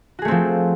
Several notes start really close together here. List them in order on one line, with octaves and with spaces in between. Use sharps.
F#4 G#4 A3 C4 F3